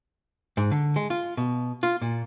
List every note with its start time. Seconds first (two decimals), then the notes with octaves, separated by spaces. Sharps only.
0.57 G#2
0.71 D3
0.96 G#3
1.10 F4
1.37 B2
1.83 F4
2.02 A#2